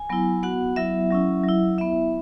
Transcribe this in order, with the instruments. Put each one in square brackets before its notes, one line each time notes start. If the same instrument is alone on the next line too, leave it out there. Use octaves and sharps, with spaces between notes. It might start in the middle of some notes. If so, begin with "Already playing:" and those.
Already playing: [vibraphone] G#5
F#3 B3 E4
B3 F#4 F#5
F#3 B3 E4 E5
F#3 C#4 E4
F#3 E4
B3 E4 E5